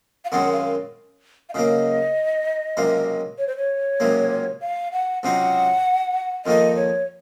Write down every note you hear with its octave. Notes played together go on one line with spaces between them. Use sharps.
F5
F#2 D#3 G#3 C4 F#5
F5
F5
C#3 F#3 A#3 D#5
C#2 C3 F#3 A#3
C#5
C5
C#5
C#2 C3 F#3 A#3
F5
F#5
C#2 C3 F#3 C4 D#4 F#5
F2 D#3 A#3 D#4 D#5
C#5